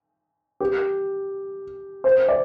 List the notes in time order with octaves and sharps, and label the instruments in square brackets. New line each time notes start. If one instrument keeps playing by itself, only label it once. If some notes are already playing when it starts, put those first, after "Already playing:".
[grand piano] G4
C5
D5